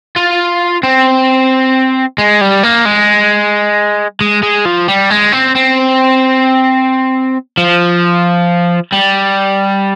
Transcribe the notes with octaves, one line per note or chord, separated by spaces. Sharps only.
F4
C4
G#3
G3
A#3
G#3
G#3
G#3
F3
G3
G#3
C4
C4
F3
G3